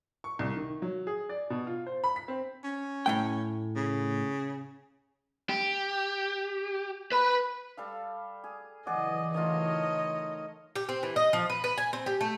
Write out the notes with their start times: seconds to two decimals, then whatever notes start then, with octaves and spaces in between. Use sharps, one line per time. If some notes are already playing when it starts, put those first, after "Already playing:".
0.24 C#6
0.39 C2
0.56 D#3
0.82 F#3
1.07 G#4
1.29 D5
1.50 B2
1.67 F4
1.87 C5
2.04 B5
2.16 B6
2.28 C4
2.64 C#4
3.06 A2 A3 G5
3.75 C#3
5.49 G4
7.12 B4 B5
7.77 G3 A4 F5
8.44 G#4
8.87 C#3 E3 F#3 G#4 D5 D#5 F#5
9.34 D#3 A3 F4 C#5 D#5
10.76 G4
10.89 C4
11.03 E3
11.16 D#5
11.33 F3
11.50 B4
11.64 B4
11.78 G#5
11.93 C4
12.06 G4
12.21 A3